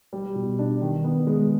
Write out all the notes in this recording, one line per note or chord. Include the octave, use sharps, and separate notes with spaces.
G3
B2
D4
D#3
B3
G#3